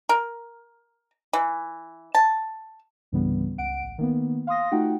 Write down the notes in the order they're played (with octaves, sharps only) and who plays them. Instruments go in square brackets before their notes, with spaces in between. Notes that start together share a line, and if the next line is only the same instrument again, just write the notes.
[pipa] A#4
E3
A5
[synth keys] C2 G2 C#3 E3 G3 B3
C#2 F#5 D7
A1
D#3 A#3 B3
F5 C6 D#6 A#6
A3 D#4 F4 F#4 F#5 G5